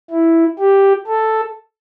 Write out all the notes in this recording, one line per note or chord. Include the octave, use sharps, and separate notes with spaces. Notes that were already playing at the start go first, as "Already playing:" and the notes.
E4
G4
A4